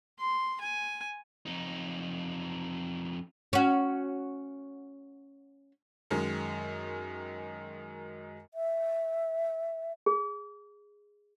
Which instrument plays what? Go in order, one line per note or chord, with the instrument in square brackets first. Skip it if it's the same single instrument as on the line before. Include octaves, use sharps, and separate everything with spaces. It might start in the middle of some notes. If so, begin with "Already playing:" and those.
[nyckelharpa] C6
G#5
[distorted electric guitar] F2 D#4
[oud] C#4 F#4
[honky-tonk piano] F#2 D#3 G#3
[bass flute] E5
[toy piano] G#4